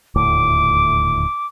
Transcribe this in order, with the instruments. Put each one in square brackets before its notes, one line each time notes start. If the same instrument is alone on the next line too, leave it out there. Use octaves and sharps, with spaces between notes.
[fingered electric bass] D#1 D2 A2 [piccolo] D6